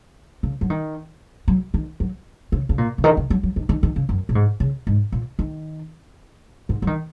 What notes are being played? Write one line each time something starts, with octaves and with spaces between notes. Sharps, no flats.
C#3
F#3
D#3
F#3
D#3
F#3
C#3
C#3
A#2
C#3
D#3
C#3
F#3
F#3
D#3
D#3
D#3
C#3
F#2
A#2
G#2
C#3
G#2
A#2
D#3
G#2
F#3
D#3